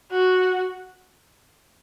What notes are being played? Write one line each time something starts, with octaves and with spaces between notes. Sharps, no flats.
F#4